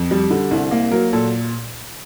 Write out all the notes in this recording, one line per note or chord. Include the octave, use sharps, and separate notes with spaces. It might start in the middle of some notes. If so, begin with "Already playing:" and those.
Already playing: F2
G3
D3
C2
A#3
F#3 A#4
A#2 A4